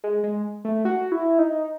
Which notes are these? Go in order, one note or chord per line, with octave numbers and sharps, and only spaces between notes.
G#3
G#3
A3
F#4
E4
D#4